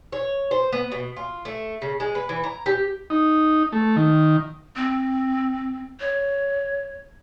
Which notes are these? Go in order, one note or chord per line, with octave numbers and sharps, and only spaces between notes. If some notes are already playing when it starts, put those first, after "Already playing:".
C#5
C5
B3
B2
F4
A3
C#3
G#3
B4
E3
A#5
G4
D#4
A3
D#3
C4
C#5